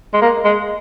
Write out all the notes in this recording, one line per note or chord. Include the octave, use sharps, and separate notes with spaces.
G#3
A#3
G#3